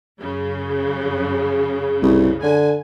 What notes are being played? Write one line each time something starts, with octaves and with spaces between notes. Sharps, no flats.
F#2 C#3
C2
D3 G#5